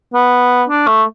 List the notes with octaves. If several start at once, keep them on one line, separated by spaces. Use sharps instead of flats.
B3
D4
A3